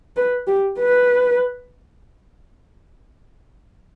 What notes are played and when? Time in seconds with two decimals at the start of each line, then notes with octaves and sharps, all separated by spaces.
0.16 B4
0.47 G4
0.79 B4